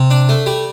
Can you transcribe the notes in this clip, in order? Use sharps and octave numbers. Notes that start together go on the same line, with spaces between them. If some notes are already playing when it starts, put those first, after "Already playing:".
Already playing: C3
D4
A3
G3